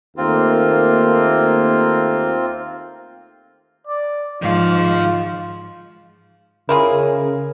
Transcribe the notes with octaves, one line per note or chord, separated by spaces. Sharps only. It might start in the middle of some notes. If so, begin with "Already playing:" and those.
D#2 A3 A#3 C4 F4
D5
G#2 D#3 F3 F4 F5
C#3 E4 F4 G#4 A#4